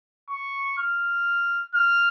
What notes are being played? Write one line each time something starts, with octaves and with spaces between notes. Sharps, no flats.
C#6
F6
F6